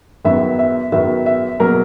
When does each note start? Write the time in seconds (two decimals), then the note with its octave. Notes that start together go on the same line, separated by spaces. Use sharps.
0.25 F#2 D#3 F#3 B3 E5
0.59 E5
0.92 F#2 D#3 F#3 B3 E5
1.26 E5
1.59 B2 F#3 A#3 A#4